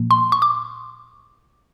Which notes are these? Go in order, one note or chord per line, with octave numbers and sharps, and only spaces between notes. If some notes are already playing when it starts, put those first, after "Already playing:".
Already playing: A#2 F3 A#3
C6
C#6
D6